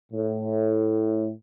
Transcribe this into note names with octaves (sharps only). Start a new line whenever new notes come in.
A2